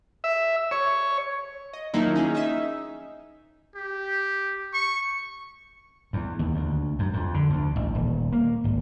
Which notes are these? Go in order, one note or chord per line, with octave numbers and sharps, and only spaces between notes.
E5
C#5
D#5
D#3 F3 F#3 A#3 D#4 E4
C#4 D#4 G#4
D#4 E5
G4
C#6
E2
D#2
D2
F#2
F2
D3
D2
A1
D#1
A#3
G#1